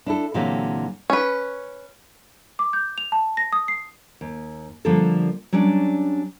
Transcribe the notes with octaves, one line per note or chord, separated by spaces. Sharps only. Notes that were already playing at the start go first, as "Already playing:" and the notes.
D4 E4 A4
A#2 D3 E3 F#3 C4 G4
C#4 B4
D6
G6
F7
A5
A#6
D#6
C7
D#2
D3 F3 G3 A3 A#3 A4
F#3 G3 C#4 D4